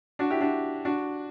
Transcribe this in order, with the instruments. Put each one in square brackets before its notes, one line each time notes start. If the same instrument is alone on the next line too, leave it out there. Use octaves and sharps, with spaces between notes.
[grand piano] D4 F#4
E4 G4
D4 F#4
D4 F#4